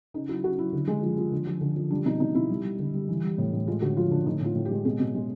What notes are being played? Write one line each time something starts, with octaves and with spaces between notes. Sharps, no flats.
C#3 D#4
F#3 E4
C#3 F#4
F#3 E4
D3
G#3
F3
F3
D3
F3
D3
F3
G3 D4
B2 D#4
B2 D#4
B2 E4
G3
G3
D3
G3
E3
G3
A2
A2
G#3 F4
D3 F#4
F3 F4
D3 D4
A2 D#4
A2 F4
A2
G4
G#3
B2 G#4
B2
G#3